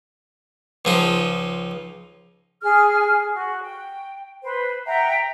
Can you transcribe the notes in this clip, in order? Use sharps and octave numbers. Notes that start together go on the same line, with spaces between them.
C#2 F3 D#4
G#4 F6
G#4
F#4
G5
B4 C5
E5 F#5 G5 A#5